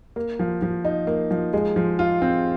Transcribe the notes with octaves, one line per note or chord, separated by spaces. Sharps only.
A#3
F3
F3
D#4
A#3
F3
G#3
F3
F4
C4